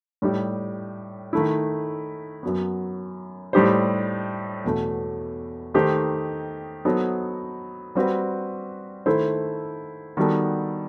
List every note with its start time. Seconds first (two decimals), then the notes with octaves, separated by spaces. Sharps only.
0.22 A2 G3 D#4 G4
1.33 D#3 A3 E4
2.43 F#2 F#3 B3
3.53 A2 G3 D#4 G4 C5
4.64 E2 B2 A3
5.74 D#3 A3 D#4 G4 C5
6.85 F#3 B3 D#4 A4 C5
7.95 G3 C4 F#4 B4
9.06 D#3 A3 E4 A4 C5
10.17 D#3 G3 B3 F#4 A4